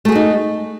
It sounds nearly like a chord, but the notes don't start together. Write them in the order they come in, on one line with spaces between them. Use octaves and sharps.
A3 G#4 F#4 D#4